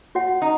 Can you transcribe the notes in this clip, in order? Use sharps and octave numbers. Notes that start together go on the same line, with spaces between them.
F#4 C#5 F#5
D#4